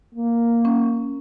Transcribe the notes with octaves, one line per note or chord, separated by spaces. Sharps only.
A#3
C#4